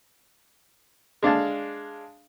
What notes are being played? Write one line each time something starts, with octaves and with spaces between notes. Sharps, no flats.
G#3 D4 F5 A5